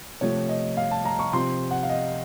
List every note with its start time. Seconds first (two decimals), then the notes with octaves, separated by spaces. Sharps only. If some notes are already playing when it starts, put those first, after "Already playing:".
0.21 C3 F3 A3 C#5
0.49 D#5
0.77 F5
0.91 A5
1.05 A#5
1.19 C#6
1.33 C3 F3 C4 C6
1.71 F#5
1.83 F5
1.89 D#5